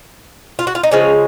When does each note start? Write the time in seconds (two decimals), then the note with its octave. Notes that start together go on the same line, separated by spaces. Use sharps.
0.59 F4
0.67 F#4
0.75 F4
0.83 D#4
0.91 C#3 F3 G#3 C#4